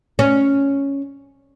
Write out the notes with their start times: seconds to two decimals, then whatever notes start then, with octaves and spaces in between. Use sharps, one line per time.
0.19 C#4